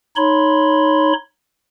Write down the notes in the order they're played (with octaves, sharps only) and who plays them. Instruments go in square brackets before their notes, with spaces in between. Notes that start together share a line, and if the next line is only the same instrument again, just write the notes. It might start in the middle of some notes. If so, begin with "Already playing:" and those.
[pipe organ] D#4 C#5 B5 C6